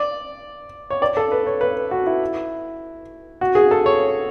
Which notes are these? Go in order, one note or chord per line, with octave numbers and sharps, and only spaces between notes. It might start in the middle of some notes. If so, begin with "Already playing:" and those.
Already playing: D5
C#5
D5
A4
B4
C#5
B4
F#4
E4
F#4
G#4
A4
C#5